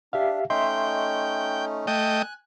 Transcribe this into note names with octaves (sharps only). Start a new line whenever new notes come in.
D4 G4 E5 F5
A3 C#4 D#4 D#5 E5 G5 C6
A3 D#5 G5 G#5 F#6